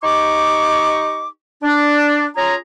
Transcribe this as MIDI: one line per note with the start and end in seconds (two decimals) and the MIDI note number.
0.04 1.28 63
0.04 1.28 67
0.04 1.28 75
0.04 1.28 85
0.04 1.28 86
1.63 2.26 62
2.37 2.55 61
2.37 2.55 65
2.37 2.55 68
2.37 2.55 82